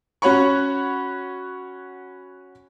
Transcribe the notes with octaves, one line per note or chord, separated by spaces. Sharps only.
C#4 F#4 C#5 B5 C#6